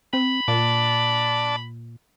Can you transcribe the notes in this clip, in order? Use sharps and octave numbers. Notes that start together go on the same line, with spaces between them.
C4 B5
A#2 D5 A5